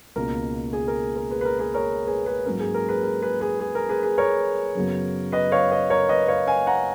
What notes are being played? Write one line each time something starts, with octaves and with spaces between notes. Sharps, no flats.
C#2 B2 A#3 C#4 A#4
G#4
A#4
A#4
G#4 B4
B4
A#4
G#4 B4
A#4 C#5
G#4 B4
G#4 B4
G#2 F#3 A#3 C#4 A#4
G#4
A#4
G#4 B4
A#4
G#4 B4
G#4 B4
G#4
A#4
G#4 B4
G#4 B4
A#4 C#5
F#2 C#3 F#3 B3
B4 D#5
C#5 F5
B4 D#5
A#4 C#5
B4 D#5
C#5 F5
F5 G#5
F#5 A#5